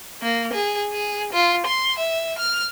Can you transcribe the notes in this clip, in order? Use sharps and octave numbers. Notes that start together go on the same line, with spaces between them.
A#3
G#4
G#4
F4
C6
E5
F6